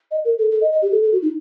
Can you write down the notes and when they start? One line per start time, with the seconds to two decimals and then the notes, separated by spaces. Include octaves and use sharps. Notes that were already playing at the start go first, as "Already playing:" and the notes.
0.11 D#5
0.25 A#4
0.38 A4
0.51 A4
0.61 D#5
0.72 D#5
0.82 G4
0.92 A4
1.03 A4
1.12 F#4
1.22 D#4